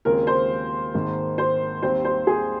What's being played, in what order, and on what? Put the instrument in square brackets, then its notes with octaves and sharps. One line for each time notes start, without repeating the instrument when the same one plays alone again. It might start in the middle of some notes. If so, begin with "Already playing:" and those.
[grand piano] D#2 C#3 G#3 C4 F4 [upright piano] A#4
[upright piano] C5
[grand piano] G#1 G#2 D#3 A#3
[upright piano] C5
[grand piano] D#2 D#3 G3 C4 [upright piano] C5
[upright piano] C5
G#4